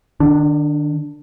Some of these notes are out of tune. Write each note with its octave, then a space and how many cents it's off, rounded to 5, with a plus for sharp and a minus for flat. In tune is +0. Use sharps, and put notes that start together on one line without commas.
D#3 -40 D4 +0